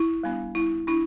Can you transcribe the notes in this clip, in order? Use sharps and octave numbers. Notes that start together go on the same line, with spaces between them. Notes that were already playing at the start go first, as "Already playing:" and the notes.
Already playing: E4
G3 B3 D4
G3 E4
D4 E4